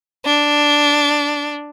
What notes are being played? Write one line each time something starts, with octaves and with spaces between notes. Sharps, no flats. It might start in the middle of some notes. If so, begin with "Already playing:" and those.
D4